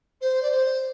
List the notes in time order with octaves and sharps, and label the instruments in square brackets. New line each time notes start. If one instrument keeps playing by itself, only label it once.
[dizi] C5
D5
C5